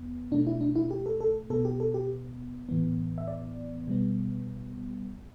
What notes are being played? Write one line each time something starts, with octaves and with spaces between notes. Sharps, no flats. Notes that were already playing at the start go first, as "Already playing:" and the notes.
Already playing: E2 B3
B2 A3 D4
E4
D4
E4
G4
A4
A4
B2 B3 A4
G4
A4
G4
A2 E3 B3
E5
D5
B2 G3 B3